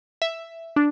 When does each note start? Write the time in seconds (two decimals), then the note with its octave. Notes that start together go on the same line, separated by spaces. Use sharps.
0.22 E5
0.76 D4